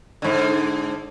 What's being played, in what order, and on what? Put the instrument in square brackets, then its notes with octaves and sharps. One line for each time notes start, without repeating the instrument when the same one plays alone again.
[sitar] G#2 D3